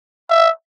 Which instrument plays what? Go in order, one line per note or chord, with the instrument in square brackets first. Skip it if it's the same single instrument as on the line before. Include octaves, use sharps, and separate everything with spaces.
[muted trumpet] E5